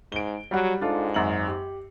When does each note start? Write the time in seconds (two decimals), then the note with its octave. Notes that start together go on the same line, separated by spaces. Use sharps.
0.12 G#2 D7 G7
0.51 F#3 G3 F#5
0.81 G#2 D4 F4 A4
1.14 G#1 F#2 F#7
1.48 G4